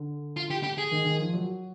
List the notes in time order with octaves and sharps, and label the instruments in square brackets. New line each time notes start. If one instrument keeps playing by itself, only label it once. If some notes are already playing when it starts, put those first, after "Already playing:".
Already playing: [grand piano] D3
[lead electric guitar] F4
G4
G4
G#4
[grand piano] D#3
D#3
F3
F#3